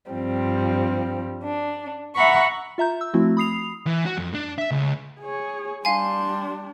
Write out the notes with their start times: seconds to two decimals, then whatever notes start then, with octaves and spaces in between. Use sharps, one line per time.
0.10 G2 F3 G3 C4
1.44 D4
2.15 E5 F#5 A#5 B5 C#6
2.78 F4 E5 A#5 G6
3.01 E6
3.14 F3 A3 C4 E4 F#4
3.37 B5 D#6 C7 F7
3.87 E3
4.06 F#4
4.17 F2
4.34 D4
4.58 E5
4.71 C#2
5.20 G#4 C#5
5.85 G3 D4 F5 G#5 C6